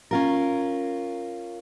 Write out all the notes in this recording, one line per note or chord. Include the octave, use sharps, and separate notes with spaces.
C#4 F4 A#4